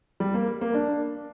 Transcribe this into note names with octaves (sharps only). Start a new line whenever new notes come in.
G3
A#3
A#3
D4